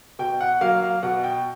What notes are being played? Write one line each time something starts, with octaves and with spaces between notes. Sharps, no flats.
B2 G5
F#5
F#3 A#3 F5
F5
B2 F#5
G5